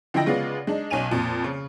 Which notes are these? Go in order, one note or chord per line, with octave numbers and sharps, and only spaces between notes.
D3 F3 D#4 E4 G5 A#6
C#3 G#3 B3 F4 D5
G#3 D4 D#4
B1 C#4 D#4 G#5 D#7 F7
F2 A#2
C#3